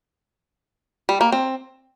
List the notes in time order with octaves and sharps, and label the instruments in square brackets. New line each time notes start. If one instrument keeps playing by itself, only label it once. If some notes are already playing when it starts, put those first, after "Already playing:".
[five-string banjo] G3
A#3
C4